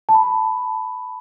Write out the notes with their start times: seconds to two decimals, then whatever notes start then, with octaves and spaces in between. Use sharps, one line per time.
0.09 A5
0.14 B5